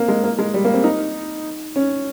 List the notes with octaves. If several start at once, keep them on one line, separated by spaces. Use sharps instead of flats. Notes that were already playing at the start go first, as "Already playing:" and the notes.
Already playing: A#3 C4
G#3
A#3
G#3
G3
A#3
C4
D#4
C#4